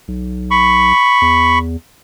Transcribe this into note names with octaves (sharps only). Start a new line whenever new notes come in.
B1
B5 C#6
E2